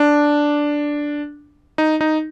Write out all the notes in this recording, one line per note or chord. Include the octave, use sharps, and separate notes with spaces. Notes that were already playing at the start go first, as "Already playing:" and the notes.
Already playing: D4
D#4
D#4